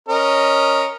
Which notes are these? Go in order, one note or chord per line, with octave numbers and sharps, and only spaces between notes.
C#4 A#4 D#5